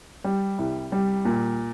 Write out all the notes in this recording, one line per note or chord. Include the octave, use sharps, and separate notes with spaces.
G3
C2
G3
A#2